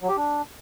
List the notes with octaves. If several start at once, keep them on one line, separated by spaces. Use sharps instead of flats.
F#3
G4
D4